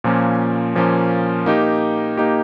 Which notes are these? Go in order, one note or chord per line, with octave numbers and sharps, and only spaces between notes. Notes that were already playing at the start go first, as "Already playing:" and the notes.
A#2 F3 A#3 C#4
A#2 F3 A#3 C#4
A#3 D#4 G4
A#3 D#4 G4